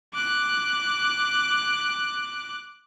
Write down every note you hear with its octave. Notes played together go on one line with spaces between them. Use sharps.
D6 F#6